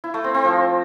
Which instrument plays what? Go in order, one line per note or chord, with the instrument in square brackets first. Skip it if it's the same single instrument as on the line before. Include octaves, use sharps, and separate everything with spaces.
[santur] E4
A3
C4
C4
F3